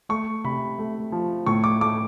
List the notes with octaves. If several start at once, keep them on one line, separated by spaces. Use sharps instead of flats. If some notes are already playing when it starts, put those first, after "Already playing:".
A3 C#6
C3 B5
A3
F3
A2 C#6
D6
A3 D6